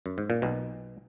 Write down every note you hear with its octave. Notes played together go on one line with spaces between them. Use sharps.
F#2
G#2
A#2
B1 B2